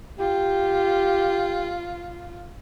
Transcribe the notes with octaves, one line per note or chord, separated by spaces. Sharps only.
F4 G4